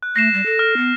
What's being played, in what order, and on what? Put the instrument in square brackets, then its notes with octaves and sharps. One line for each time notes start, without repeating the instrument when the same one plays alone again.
[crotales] F#6
[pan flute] A3 [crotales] A#6 C7 E7
[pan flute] G3
A4
[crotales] F6
[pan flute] B3